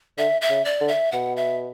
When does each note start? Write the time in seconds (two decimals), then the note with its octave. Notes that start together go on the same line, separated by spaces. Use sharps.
0.18 D3 E5
0.41 E5
0.50 C#3
0.65 D5
0.81 D3
0.89 E5
1.12 B2 F#5
1.37 E5